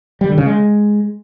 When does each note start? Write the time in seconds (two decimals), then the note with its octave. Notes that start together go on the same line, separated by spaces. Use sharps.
0.21 G3
0.29 D3
0.38 C#3
0.46 G#3